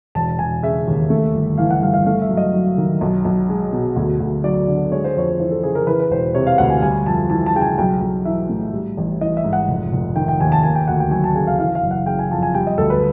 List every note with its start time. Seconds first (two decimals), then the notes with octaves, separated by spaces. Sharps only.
0.15 E1 A5
0.39 E1 G#5
0.63 C#3 E5
0.87 D#2
1.10 A3
1.34 G1
1.58 E3 F5
1.70 F#5
1.82 G2 F5
1.94 F5
2.06 A3 F5
2.22 E5
2.29 F#2
2.37 D#5
2.53 F#3
2.78 D#3
3.01 B1
3.25 B1
3.49 G#3
3.73 B2
3.96 D2
4.20 D2
4.44 F#3 D5
4.68 D3
4.92 G#3 C#5
5.04 C5
5.16 F2 C#5
5.40 E3 C5
5.51 A4
5.63 C#3 G#4
5.75 A#4
5.87 E3 B4
6.00 B4
6.11 E1 C5
6.34 C3 C#5
6.47 F5
6.58 D2 F#5
6.70 G#5
6.82 G3 G#5
7.06 F2 A5
7.30 E3 A5
7.46 A5
7.55 C#3 G5
7.61 G#5
7.78 B1 G5
8.01 B1
8.25 E3 E5
8.49 A2
8.73 G3
8.97 A1
9.21 E3 D#5
9.37 E5
9.44 G#2
9.53 F#5
9.69 F1
9.93 F1
10.16 D#3 G5
10.28 G5
10.40 D#2 G#5
10.52 A5
10.63 A#3 G#5
10.75 G5
10.88 D2 F#5
11.00 G5
11.11 F#3 G#5
11.24 A5
11.35 C#3 G#5
11.47 F5
11.59 E3 F5
11.75 F5
11.83 F#1
11.91 F#5
12.06 C#3 G5
12.19 G#5
12.31 F2 A5
12.43 G#5
12.54 G3 G5
12.67 D#5
12.78 D2 A4
12.90 B4